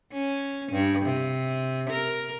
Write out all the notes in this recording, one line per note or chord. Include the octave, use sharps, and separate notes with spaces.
C#4
G2
C3
A#4